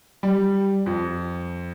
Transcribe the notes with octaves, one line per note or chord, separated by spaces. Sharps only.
G3
F2